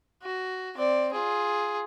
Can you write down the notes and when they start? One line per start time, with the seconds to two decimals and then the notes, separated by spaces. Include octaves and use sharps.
0.23 F#4
0.77 C4 D5
1.12 F4 G#4